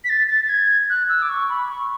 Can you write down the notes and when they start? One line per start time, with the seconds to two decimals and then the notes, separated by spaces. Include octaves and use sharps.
0.04 B6
0.09 A6
0.28 A6
0.45 A6
0.49 G#6
0.90 F#6
1.09 E6
1.22 D6
1.29 C#6
1.49 B5
1.69 C#6